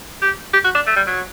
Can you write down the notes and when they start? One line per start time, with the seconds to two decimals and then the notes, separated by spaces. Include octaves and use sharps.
0.22 G4
0.53 G4
0.64 F#4
0.75 D4
0.86 A3
0.96 G3
1.07 F#3